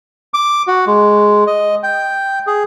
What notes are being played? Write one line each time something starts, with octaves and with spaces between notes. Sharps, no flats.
D6
F#4
G#3
D#5
G5
G#4